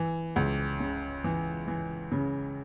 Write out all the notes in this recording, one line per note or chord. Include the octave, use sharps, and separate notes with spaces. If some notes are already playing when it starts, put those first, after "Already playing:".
Already playing: E3
C#2
C#3
E3
E3
C#3